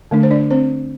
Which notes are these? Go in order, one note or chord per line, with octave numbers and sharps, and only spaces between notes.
D3 A3 D4
C5
D4 D5
C4 C5